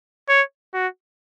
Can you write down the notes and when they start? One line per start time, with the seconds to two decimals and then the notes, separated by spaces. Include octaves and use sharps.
0.29 C#5
0.74 F#4